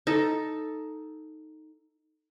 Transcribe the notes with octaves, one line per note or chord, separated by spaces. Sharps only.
D#4 A4